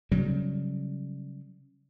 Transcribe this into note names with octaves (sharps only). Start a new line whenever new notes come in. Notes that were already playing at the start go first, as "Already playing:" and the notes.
C#3 F#3 G3